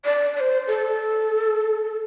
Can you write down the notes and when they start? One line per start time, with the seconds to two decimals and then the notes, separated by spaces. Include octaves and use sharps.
0.05 D5
0.36 D5
0.40 C5
0.68 A4